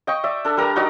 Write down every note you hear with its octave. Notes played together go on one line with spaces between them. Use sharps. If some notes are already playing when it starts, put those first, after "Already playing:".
D#5 G5 C#6
D5 E5
D4 A4
G3 A#4 A#5
D#4 F#4 D5 D#5